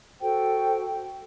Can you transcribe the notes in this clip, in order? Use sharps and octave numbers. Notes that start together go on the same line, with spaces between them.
F#4 A4 C5 G5